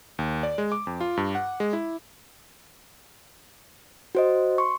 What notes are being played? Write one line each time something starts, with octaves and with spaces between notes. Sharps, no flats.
D#2
D5
G#3
D6
F2
F4
G2
F#5
G#3
E4
F#4 C5 D#5
C6 C#6